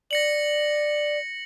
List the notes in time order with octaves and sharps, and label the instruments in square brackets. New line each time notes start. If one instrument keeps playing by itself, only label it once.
[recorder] D5 [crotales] A#6 C#7 F#7